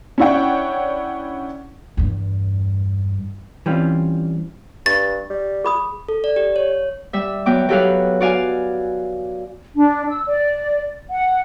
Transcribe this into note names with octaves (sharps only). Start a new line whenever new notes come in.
C#4 D4 E4 C#5 F#5 G5
E2 G2
E3 G3 C4 C#4 F4
G2 C#6 A6
G3
G#4 B5 D#6
A4
D5
G4
C#5
G3 E5 E6
F#3 B3 G5 D6
F#3 G4 A4 B4 F5
F#4 D5 F5 G#5
D4
E6
D5
F#5